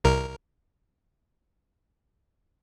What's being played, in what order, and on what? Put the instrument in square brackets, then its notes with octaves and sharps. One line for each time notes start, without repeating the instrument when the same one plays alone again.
[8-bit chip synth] C2 A#4